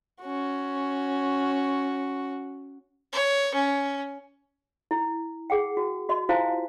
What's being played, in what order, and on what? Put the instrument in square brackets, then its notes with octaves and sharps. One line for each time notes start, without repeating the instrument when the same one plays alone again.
[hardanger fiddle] C#4 F#4
C#5
C#4
[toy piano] E4
G#4 F#5 G5
F#4
F#4 D#5 C6
E4 F4 C5 F5 G#5 A5